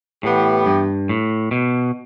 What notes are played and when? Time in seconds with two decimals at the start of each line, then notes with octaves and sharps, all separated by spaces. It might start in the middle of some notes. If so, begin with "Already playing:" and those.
0.23 A2 E3 B3 G4
0.66 G2
1.09 A2
1.51 B2